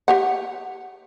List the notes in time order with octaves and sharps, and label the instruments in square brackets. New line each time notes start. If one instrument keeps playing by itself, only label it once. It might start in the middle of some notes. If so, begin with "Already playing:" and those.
[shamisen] G4 C#5 F#5